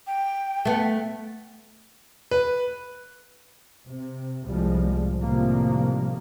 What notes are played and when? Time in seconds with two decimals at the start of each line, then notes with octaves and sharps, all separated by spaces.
0.07 G5
0.65 A3 B3
2.31 B4
3.88 C3
4.44 C2 A2 F3 G3 G#3
5.20 A2 C3 D#3 F3 G3 A#3